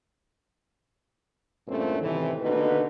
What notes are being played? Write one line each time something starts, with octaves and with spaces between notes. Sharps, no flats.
E2 G2 A#2 A3 C4 C#4
A2 C3 D#3 E3
D#2 B2 D3 D#4 B4